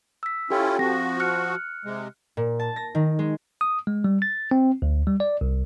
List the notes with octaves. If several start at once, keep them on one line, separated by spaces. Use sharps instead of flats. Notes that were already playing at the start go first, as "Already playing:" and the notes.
E6 B6
C#4 E4 F4 G4 A4 G5
F3 C4 F#4 A#6
F6 F#6 C#7
C3 G#3
A#2
A5
A#6
D#3
G#3
D#6
G#3
G3
A6
C4
D2
G3
D5
C2